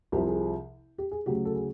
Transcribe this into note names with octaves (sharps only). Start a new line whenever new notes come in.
C2 C3 F3 G4
G#4
G4
G#4
D2 C#3 F#3 G4
A4
G#4